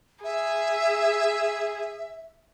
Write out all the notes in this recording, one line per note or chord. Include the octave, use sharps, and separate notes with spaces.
G#4 E5